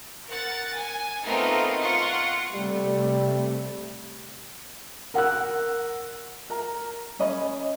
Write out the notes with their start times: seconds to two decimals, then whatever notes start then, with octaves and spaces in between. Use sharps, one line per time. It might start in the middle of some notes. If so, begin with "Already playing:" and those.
0.27 A#4 F#5 A6
0.73 G#5
1.24 A3 B3 C4 D#4 F4 A#4
1.82 F4 F#5 C#6
2.52 C3 G3 A3
5.14 A#4 F#5 E6 F#6
6.50 A#4 A#5
7.19 C#4 C#5 D#5 B5